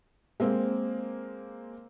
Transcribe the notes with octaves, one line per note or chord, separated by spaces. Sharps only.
G#3 A#3 C4